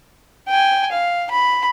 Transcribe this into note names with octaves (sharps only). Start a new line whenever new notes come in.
G5 G#5
F5
B5